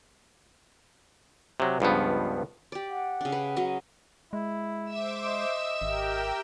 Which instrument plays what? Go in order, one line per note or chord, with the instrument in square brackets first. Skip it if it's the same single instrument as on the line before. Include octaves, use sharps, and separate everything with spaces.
[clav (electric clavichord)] C3 F#3
C#2 G2 F3 B3
[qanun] G4 D5
[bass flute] F#5
[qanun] C#3 D4
B4
C#3 F#3 D#5
[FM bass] G#3 [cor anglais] E4
[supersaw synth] C5 D6 [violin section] E5 E6
[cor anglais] D#5
[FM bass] G#1 [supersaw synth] G4 A#4 G5